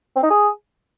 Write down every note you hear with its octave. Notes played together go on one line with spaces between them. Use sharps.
C4
D#4
G#4